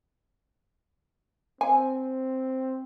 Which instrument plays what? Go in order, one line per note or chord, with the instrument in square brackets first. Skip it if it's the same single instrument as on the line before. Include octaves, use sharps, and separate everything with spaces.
[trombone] C4 [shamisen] G#5